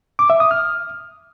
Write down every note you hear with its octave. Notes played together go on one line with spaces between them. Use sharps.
D6
E5
D#6
F6